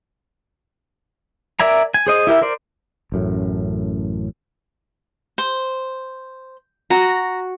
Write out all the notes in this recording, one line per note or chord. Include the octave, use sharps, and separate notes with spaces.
A#4 D5 E5 G#5 A#5
G#5
G#4 C5 D#5
E4 G4 A#4 E5
A#4 C5 D5
A1 F#2 A2
C5
F#4 A#5